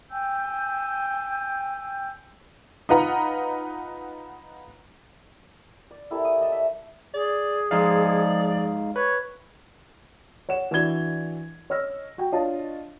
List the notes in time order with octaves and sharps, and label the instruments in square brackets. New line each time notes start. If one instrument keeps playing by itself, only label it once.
[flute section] G5 G#5 E6 G6
[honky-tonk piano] D#4 F4 B4 F#5 A#5
[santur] D5
E4 G4 A4 A#4
D#6
D5 D#5 A5
E5
[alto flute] G#4 [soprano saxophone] D5
[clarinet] F3 [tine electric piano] G#3 D#4 F5 [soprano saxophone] D5
[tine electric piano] B4 [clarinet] C#5
[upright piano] C#5 F#5 E7
E3 D4 F#4 D5 G#6 G7
C#5 D#5 E6 F6 A#6
F#4 G5
D4 F4 C#5 D#5 A5